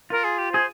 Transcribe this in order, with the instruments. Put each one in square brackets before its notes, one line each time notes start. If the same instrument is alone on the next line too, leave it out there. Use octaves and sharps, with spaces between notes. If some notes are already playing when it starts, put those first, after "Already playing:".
[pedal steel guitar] F4 [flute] A#4
[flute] G#4
G4
[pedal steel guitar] G#4 [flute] C5